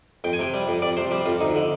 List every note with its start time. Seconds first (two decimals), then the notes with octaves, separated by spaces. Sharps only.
0.24 F2 G5
0.33 G#5
0.39 C3 G5
0.54 G3
0.68 F2
0.82 F2 D5
0.97 C3 C5
1.11 G3 G4
1.26 F2 F4
1.41 D2 D#4
1.55 D3